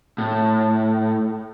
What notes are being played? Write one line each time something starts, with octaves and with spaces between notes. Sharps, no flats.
A2